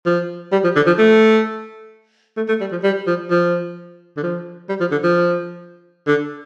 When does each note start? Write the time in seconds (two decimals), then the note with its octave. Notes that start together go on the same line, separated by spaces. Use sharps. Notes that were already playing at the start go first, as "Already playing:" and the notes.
0.06 F3
0.52 G3
0.64 F3
0.76 D3
0.87 F3
0.99 A3
2.37 A3
2.49 A3
2.61 G3
2.72 F3
2.84 G3
3.07 F3
3.31 F3
4.17 D3
4.23 F3
4.69 G3
4.80 F3
4.91 D3
5.04 F3
6.08 D3